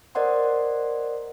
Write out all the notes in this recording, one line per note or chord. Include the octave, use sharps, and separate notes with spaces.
A#4 C5 D5 D#5 F#5 C6